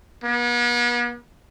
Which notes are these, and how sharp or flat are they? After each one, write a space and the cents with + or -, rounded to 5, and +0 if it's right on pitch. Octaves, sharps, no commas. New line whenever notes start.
B3 -45